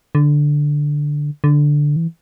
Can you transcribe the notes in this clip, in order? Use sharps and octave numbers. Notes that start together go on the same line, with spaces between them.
D3
D3
E3